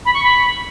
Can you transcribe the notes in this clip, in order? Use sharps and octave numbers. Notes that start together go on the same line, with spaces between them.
B5
C#6
B5